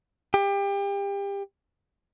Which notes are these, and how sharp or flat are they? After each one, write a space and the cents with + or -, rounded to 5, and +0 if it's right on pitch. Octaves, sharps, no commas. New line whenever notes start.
G4 +30